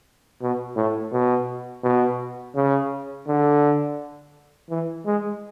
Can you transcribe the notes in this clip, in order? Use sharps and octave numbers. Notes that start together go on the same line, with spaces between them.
B2
A2
B2
B2
C#3
D3
E3
G#3